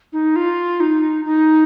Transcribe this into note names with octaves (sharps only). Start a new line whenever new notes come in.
D#4
F4
D#4
D#4